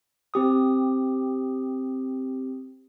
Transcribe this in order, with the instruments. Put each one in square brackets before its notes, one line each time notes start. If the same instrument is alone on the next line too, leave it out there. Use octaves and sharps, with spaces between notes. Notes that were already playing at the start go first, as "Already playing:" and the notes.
[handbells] C4 G4 D#6